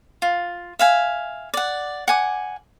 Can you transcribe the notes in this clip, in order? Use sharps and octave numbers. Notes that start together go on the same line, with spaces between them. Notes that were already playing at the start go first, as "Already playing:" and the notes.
F4
E5 F5 G#5
D5 F#5
F#5 G#5 D6